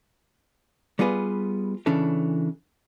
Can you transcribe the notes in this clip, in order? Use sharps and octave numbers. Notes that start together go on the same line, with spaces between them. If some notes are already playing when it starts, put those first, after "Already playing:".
G3 B3 F4 G#4 B4
C#3 E3 C#4 D4 A4